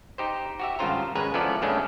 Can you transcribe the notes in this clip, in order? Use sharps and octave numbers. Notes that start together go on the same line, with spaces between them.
D#4 G4 C5
F#4 G4 E5
G#1 G2 C#3 F4 C5 A#5
G#1 C#3 G#3 B4 G#5 A#5
F3 B3 C#4 E4 A4 D5
G2 C#3 G#3 A3 C#4 D4